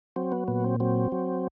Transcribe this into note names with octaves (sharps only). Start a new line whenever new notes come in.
F#3 C4
B3
A#2 B3
C4
F#3 C4
F#3